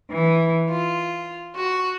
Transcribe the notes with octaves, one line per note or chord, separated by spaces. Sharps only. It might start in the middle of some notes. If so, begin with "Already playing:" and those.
E3
F4
F#4